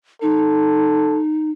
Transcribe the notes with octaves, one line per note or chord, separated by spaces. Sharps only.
D#4 A4